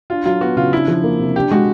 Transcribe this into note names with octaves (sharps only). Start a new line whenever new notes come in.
D4 F4
F#3 F4
B3 F#4
C#3 F4
D4 E4
F3
A#3
C3
D4 G4
G#3 F#4